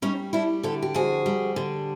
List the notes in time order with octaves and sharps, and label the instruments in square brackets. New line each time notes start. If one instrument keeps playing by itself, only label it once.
[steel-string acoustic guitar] G3 C#4 D#4
G3 D4 E4
D3 G4 A4
G4
F2 F#4 G#4
G3
D3